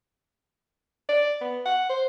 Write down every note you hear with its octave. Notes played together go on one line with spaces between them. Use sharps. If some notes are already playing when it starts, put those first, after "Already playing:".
D5
B3
F#5
C5